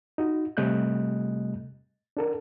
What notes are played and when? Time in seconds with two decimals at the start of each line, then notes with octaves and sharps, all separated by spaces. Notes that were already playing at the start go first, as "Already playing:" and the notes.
0.18 D#4 F#4
0.57 C3 G3 A3 D#5 F#6 G6
2.17 D4 A4 A#4